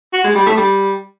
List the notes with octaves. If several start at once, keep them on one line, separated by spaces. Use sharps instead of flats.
F#4
G#3
G3
A3
G3